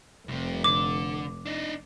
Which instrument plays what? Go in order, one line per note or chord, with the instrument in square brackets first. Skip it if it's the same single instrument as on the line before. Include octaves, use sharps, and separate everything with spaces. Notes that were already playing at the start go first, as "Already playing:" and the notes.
[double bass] F1 [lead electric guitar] C2 C3
[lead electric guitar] D3 [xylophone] D6
[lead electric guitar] D4 D#4